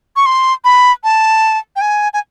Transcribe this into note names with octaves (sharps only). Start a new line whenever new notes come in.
C#6
C6
B5
A5
G5
G#5
G#5